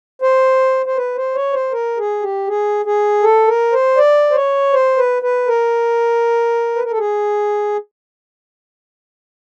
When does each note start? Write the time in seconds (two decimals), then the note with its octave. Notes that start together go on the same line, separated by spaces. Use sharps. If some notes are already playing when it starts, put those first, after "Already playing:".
0.22 C5
0.86 C5
0.97 B4
1.16 C5
1.35 C#5
1.53 C5
1.72 A#4
1.98 G#4
2.22 G4
2.48 G#4
2.85 G#4
3.23 A4
3.48 A#4
3.72 C5
3.97 D5
4.31 C5
4.35 C#5
4.73 C5
4.98 B4
5.22 B4
5.48 A#4
6.76 B4
6.84 A#4
6.91 A4
6.98 G#4